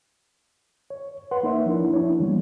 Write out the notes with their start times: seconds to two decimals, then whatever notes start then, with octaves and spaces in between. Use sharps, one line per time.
0.90 C#5
1.31 B4 F#5 C6
1.43 A#3 D#4 A#4 C#5 E5
1.66 F3 D4 E4
1.94 D4 E4 C#5
2.20 E3 G3 A#3 B3